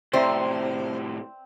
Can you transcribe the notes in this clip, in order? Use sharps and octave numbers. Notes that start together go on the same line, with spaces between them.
A2 C3 C4 C5 D5 E5 A#5